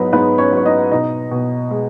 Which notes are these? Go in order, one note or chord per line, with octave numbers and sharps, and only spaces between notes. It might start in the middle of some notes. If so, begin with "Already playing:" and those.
Already playing: G#2 F#3 B3 D#4 B4 D#5
G#2 B3 B4
C#4 C#5
F#3 C#5
D#4 D#5
B2 D#4 D#5
B2
G#3